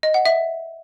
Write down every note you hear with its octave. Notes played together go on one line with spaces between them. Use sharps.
D#5
F#5
E5